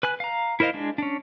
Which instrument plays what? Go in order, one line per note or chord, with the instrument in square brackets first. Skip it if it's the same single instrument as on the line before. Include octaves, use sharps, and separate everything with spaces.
[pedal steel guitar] B4 G#5 F#6
F5 A#5
E4 A#4 C5 D#5 F5
G#3 D4
C#4 D4